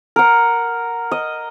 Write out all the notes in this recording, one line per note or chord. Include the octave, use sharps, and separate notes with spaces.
A#4 F#5
D#5